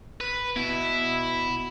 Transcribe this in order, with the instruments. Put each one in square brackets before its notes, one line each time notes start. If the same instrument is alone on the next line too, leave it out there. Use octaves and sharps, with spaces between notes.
[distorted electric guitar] B4
[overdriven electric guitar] B2 [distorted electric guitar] E4